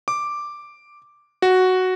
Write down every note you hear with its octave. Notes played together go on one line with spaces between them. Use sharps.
D6
F#4